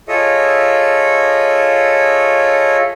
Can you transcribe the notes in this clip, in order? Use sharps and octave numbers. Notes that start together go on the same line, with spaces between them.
F4 G#4 A4 C#5 D#5 E5